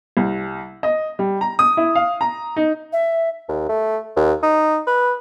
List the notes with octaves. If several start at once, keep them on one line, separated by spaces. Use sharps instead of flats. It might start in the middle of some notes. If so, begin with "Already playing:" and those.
C2
D#5
G3
A#5
D#6
E4
F5
A#5
D#4
E5
D#2
A3
D#2
D#4
B4